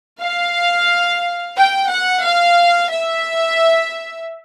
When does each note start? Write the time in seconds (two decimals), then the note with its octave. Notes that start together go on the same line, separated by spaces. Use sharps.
0.21 F5
1.56 G5
1.90 F#5
2.23 F5
2.90 E5